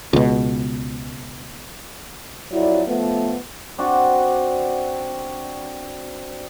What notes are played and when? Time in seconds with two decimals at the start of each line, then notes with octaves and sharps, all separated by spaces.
0.13 C#2 B2
2.52 F2 F#3 E4 D5
2.87 F3 A3 B3
3.78 C4 D4 F#4